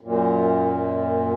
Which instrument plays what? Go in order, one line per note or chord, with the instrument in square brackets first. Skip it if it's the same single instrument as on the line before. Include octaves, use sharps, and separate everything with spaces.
[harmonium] F#2 A#2